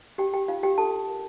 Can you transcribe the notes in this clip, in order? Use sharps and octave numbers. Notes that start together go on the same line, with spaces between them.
D#4 G4 G5
G4 G5
D#4 F4 F5
G4 G5
D4 A4 A5
A#4